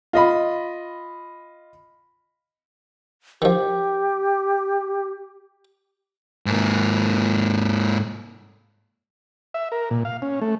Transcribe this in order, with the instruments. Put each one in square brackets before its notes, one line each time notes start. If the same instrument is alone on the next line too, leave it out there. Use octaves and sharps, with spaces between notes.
[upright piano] F4 D#5 B5
[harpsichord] D#3 F3 [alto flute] G4
[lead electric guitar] G#2 A#3
[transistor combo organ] E5
A#4
A#2
F5
C#4
A3